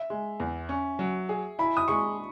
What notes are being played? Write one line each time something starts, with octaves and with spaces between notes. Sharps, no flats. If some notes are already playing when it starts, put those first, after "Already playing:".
Already playing: E5
G#3
E2
C#4
F#3
G#4
E4 B5
D#6
G#3 C#6